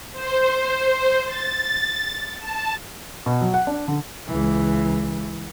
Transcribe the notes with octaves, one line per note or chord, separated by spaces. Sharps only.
C5
A6
A5
B2
F#3
F#5
D4
D3
C#2 E3